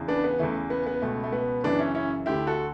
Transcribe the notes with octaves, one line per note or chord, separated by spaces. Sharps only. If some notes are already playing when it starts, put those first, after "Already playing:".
Already playing: E2 C#3 E3
B3 D4
B3
E2 C#3 E3 A3
B3
B3
C#2 B2 A3
A3
B3
F#2 C#3 E3 B3 D4
C#4 E4
C#4 E4
D2 D3 E4 G4
F#4 A4